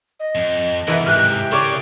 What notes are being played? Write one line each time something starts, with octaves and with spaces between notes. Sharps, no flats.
D#5
F2
C3 E3 B3 C#4 A#4 F#5
G#2 C3 G4 F6 F#6
C#3 A#4 C#5 D5